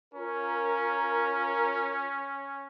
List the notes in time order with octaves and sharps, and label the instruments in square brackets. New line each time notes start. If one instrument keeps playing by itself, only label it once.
[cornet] C#4 [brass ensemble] F4 A#4